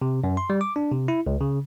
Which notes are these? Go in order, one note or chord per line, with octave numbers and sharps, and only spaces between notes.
C3
F#2
C6
G3
D6
D4
C3
E4
C#2
C#3